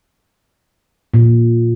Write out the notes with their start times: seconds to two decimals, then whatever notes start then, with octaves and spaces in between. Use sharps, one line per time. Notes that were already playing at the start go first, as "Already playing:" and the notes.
1.14 A#2